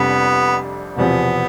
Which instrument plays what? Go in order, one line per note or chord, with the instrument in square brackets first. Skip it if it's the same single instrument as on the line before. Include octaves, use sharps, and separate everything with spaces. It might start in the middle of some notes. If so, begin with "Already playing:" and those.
Already playing: [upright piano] F1 F2 C3 G3 D4 [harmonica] B3
[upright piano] E1 E2 C3 F3 [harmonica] B3